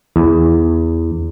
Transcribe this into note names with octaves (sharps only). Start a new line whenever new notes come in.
E2